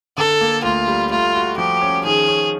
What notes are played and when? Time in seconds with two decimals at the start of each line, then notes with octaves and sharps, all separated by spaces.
0.18 D3 A4
0.41 A#3
0.64 D2 F4
0.88 G3
1.11 A3 F4
1.35 F#4
1.57 F3 G4
1.81 C#4
2.05 D#3 G#4
2.28 C#4